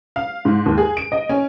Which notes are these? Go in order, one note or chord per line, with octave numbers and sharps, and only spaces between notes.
F5
G#2
D#2
G#4
D7
D#5
C#4